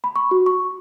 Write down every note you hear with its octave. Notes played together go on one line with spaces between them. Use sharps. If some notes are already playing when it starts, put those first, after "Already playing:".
B5
C#6
F#4
C#6